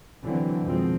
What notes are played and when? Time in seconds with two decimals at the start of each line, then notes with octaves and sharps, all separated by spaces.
0.22 D3 E3 F#3 C4
0.63 F2 B2 D#3 F3 G#3 C4